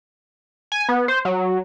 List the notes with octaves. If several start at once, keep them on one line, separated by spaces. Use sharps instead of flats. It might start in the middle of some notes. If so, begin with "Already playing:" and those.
G#5
B3
C5
F#3